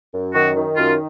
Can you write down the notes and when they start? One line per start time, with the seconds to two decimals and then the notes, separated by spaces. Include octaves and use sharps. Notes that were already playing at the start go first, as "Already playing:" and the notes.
0.14 F#2
0.35 D#3 F#4
0.56 D#3
0.77 F#2 F4